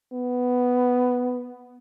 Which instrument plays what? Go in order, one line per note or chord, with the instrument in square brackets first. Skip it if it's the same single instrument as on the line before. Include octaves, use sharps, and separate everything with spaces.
[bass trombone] B3